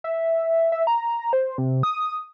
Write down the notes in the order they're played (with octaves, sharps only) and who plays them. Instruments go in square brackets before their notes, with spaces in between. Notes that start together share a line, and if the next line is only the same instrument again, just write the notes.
[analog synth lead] E5
E5
A#5
C5
C3
D#6